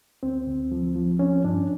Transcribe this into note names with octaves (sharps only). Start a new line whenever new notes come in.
D2 C4
D2
F3
F3
F3 C#4
G2 D4